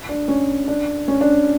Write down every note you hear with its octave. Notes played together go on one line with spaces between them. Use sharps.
D4
C#4
D4
C#4
D4